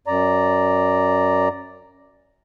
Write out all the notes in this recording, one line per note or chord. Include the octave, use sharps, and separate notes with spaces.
F#2 D5 A#5